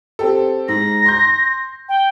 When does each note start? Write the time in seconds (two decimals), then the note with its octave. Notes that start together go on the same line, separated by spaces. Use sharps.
0.19 C4 G4 A4
0.68 G#2 A#6
1.06 C6 G6
1.89 G5